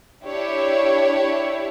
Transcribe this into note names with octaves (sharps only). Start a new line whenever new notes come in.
D4 E4 G4 C#5 E5